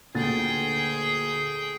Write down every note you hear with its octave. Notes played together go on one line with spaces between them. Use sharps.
D2 A#2 G#4 G5 A6